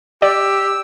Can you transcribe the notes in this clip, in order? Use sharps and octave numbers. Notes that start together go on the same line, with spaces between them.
G4 D5 E6